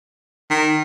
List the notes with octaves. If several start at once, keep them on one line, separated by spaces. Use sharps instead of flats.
D#3